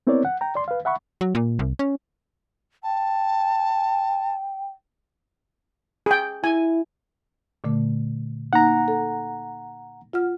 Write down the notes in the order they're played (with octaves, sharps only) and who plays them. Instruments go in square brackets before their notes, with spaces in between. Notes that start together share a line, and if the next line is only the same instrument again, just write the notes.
[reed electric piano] B3 C4 E4 A#4 C#5 D5
F#5
G5 A#5
D5 C6
B4 F5
E5 F#5 B5 C#6
[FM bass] F#3
A#2
C2
C#4
[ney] G5 [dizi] A5
[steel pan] G#4 G5
[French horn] E4 [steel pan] G#5
[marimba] A#2 D3 A3
[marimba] A#3 D#4 [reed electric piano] F#5 A#5
[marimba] A4
F4 F#5 F6